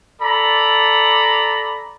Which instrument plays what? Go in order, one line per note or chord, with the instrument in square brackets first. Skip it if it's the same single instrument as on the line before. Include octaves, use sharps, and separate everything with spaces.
[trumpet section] A4 D5 A#5 B5